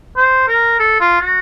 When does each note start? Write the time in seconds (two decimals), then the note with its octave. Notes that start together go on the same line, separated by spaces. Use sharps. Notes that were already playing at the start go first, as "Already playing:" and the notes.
0.17 C5
0.48 A#4
0.80 A4
1.01 F4
1.21 F#4